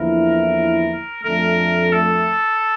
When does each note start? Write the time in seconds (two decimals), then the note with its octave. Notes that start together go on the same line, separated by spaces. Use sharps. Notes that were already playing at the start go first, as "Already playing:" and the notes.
Already playing: E2 D3 F3 A#3 E4 A#4
1.24 F2 D3 A3 A#4
1.92 A4